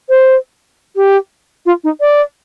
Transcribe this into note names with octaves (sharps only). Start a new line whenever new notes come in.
C5
G4
F4
D#4
D5